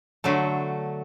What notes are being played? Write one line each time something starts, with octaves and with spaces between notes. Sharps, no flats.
D3 F#3 A3